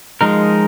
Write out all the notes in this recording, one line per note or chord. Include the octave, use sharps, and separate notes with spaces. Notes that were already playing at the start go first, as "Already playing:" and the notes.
F3 G#3 D#4 A#4